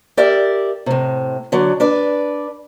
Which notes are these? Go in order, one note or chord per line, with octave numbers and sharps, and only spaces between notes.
G4 A#4 D5 E5
A2 C3
D3 F#3 D4
D4 B4 D5